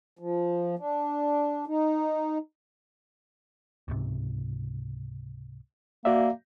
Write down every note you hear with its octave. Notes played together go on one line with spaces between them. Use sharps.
F3
D4
D#4
C#2 G#2 C3
A#3 F#4 D5 E5